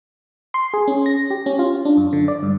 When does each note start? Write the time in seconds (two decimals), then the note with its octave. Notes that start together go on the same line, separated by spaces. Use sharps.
0.54 C6
0.74 G#4
0.88 C#4
1.06 A#6
1.30 G4
1.46 C#4
1.59 F4
1.85 D4
1.97 F#2
2.13 D3
2.28 D5
2.43 G2